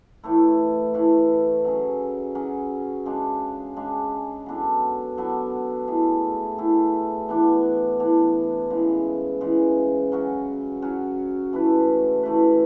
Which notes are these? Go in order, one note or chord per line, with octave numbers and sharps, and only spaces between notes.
A2 E3 A3 E4
A2 E3 A3 E4
F#3 C#4 G#4
F#3 C#4 G#4
C#3 G#3 D4 G#4
C#3 G#3 D4 G#4
F#3 B3 D4 A4
F#3 B3 D4 A4
A3 E4 G#4
A3 E4 G#4
E3 B3 D4
E3 B3 D4
C#3 E3 G#3
C#3 E3 G#3
F#3 C#4 F#4
F#3 C#4 F#4
E3 A3 E4 B4
E3 A3 E4 B4